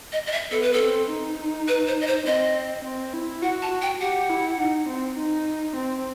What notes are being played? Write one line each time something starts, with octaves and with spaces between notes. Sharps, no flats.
D#5
D#5
E5
B3 A4
B4
A4
C4
D#4
B4
C5
D#5
C5
C4 D#5
C4
E4
F#4 F#5
A5
F#4
G5
G4 F#5
E4
D#4
C4
D#4
C4